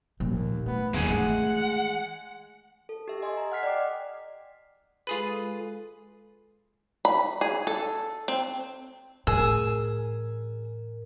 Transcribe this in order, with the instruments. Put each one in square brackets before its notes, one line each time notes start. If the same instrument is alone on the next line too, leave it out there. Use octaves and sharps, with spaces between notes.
[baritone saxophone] D#2 [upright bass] A#2 F3
[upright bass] A3 [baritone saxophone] B3
[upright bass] D#2 [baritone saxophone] C#3 [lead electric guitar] A#3 G#4
[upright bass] E3 A3 [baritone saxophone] G#3 [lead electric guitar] F#5
[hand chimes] A4
G4 E5
D#5 G#5 C6
A#5
F#5 F6 B6 C7
D5 D#5 G5 D6
[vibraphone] G#3 A4 [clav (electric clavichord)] F4 G#4 B4
[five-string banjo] B5
G#4
A4
C4
[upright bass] A2 E3 [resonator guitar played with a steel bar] G#4 [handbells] A#4 [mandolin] E6